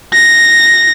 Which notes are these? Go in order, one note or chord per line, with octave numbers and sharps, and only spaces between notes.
A#6